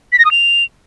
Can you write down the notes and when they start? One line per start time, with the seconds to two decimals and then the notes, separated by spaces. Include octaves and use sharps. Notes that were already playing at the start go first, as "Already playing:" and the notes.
0.12 B6
0.19 A#6
0.25 D#6
0.31 F7